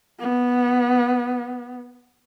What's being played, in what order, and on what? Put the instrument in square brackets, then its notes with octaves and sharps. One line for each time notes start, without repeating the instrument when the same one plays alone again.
[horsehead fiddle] B3